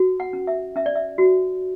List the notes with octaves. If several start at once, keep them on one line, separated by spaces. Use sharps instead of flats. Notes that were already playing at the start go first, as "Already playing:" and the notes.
Already playing: F#4
F#5
C#4
E5
C#4 E5
D5
E5
F#4